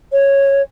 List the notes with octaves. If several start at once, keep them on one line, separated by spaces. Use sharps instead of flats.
C#5